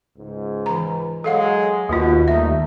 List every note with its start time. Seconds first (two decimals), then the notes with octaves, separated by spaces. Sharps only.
0.18 C#2 G#2
0.66 E3 A#5
1.24 F#3 G#3 A4 F5 F#5
1.89 D#2 B2 A#3 F4
2.28 G3 A3 D#4 E5